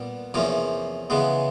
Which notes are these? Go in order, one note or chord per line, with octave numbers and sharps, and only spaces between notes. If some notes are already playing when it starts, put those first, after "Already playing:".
Already playing: A#2 G3 B3
E2 C3 F3 A#3 C#4
C#3 E3 G#3 B3